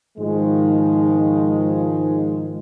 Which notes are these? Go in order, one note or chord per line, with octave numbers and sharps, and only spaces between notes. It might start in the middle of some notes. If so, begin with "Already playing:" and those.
G#2 D#3 F3 G#3